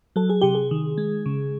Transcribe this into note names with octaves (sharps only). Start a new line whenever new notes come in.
F#3 A4
G#4
C3 G4
G#4
D#3
G#3
C#3